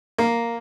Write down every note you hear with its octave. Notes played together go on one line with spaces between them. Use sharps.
A#3